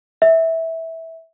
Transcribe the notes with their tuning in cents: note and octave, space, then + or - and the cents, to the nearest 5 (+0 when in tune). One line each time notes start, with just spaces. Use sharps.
E5 -15